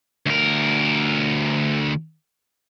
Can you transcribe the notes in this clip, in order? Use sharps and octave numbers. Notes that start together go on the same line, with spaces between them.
D2 A#4